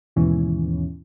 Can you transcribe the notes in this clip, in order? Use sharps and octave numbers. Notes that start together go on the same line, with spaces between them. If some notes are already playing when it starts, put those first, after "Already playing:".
D#2 G#2 B2 E3 C#4